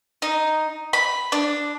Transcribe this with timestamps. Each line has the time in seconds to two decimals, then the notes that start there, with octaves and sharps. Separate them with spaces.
0.22 D#4
0.93 B5
1.32 D4